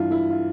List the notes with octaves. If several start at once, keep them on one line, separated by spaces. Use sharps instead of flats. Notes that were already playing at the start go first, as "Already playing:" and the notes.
Already playing: G2 E3 E4 F4
E4
F4